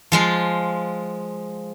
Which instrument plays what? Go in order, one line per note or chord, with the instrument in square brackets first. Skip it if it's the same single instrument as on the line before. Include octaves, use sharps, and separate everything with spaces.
[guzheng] F3 G#3 F4